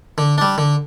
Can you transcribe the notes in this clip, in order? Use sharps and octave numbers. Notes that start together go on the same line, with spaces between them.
D3
G3 D4
D3